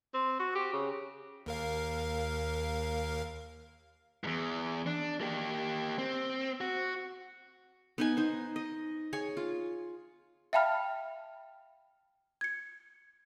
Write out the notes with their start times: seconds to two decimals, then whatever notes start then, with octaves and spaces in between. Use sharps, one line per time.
0.14 C4
0.40 F#4
0.55 G4
0.73 C#3
1.46 D#2 A#4 F5
4.24 E2 G2
4.86 D4
5.21 A#3 G4
5.98 C4
6.61 F#4
7.98 B3 D#4 G#5
8.17 D#4 C5
8.56 D#5
9.13 G#4 C#5 G#5
9.37 F4
10.53 E5 F5 G5 A5 B5 F6
12.41 G#6 C#7